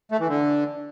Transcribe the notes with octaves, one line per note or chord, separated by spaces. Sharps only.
A3
E3
D3